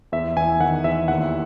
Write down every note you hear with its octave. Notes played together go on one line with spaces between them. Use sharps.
E2 E5
E2 G#5
D#3 F#5
E2 E5
D#2 F#5